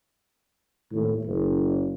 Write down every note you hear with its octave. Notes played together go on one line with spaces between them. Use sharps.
G#1 D#2 A2
F#1